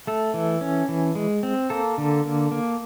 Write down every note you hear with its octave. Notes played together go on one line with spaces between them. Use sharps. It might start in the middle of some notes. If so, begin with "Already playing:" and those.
A3 A4
E3
C#4
E3
G#3
C4
A#3 A4
D3
A#3
A#3